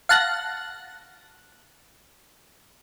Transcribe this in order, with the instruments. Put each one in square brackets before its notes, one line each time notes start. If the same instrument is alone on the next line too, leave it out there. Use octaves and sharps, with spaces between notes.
[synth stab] F5 F#5 A5 F#6 A#6